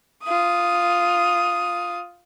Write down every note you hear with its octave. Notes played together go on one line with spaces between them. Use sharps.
F4 D#6